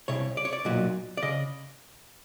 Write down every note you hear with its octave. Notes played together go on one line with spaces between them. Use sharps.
C2 C3 C#5
D5
C#5
D5
B1 A#2 F#3
D5
C#3 D#5